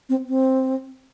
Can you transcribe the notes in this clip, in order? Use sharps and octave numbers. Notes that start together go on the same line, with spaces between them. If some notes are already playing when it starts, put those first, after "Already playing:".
C4
C4